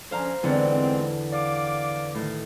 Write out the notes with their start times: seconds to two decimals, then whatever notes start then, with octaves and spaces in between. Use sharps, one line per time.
0.11 D3 F3 C#4 C5 F5 A#5
0.43 E2 G#2 D3 G#3 B3 C4
1.33 D5 F5 D6
2.15 A2 D#3